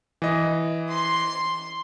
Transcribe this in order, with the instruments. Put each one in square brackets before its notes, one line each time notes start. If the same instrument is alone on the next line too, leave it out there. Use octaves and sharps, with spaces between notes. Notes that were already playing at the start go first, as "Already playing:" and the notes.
[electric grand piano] E3 D#5
[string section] C6